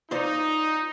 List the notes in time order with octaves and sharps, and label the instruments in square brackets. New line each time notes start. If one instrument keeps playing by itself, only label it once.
[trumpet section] D#4 [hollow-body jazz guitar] F4 C5 D5